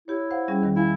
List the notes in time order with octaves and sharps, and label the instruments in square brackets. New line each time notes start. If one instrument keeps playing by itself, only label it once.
[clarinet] E4 [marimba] G4 C#5
[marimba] C5 F5 F#5
G3 C#4 G#4
E2 D#3 G3
[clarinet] E4 [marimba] F5 G#5